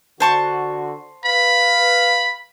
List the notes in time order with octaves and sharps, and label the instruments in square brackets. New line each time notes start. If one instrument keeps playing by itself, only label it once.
[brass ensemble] D3 F#4 [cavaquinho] C5 A5 C#6
[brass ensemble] B4 F5 [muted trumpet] B5